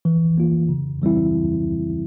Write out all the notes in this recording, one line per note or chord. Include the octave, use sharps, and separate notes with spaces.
E3
A#3 F4
C#3
E3 G3 C4 E4